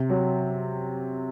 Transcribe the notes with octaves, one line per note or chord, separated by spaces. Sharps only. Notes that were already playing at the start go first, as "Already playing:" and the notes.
Already playing: C3
F#3